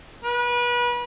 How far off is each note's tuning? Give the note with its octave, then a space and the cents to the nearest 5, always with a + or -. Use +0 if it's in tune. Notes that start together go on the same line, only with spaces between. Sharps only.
B4 -30